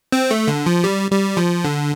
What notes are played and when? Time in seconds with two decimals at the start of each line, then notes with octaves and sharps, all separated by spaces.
0.12 C4
0.31 A3
0.48 D3
0.66 F3
0.84 G3
1.11 G3
1.37 F3
1.64 D3